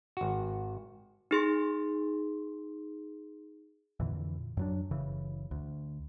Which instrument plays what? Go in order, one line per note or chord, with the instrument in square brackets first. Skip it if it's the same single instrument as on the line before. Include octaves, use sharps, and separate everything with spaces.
[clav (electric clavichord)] G#1 F#4
[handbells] D#4 G#4 C6
[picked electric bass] F2 A#2 D3 E3
F#2 F#3 D4
F#1 C#3 E3
D2